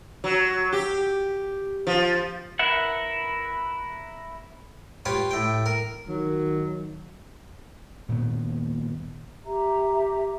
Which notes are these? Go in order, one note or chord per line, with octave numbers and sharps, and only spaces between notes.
F#3
G4
F3
E4 A#4 B4 E5 F#5
F4 G4 B4 C#5
A2 G5
A#4
D#3 F#3
D#1 A#2 D#3 B3
G4 E5 A#5